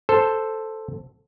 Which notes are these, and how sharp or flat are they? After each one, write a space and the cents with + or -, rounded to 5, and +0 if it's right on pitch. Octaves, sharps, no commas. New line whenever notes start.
A4 +0 C5 +0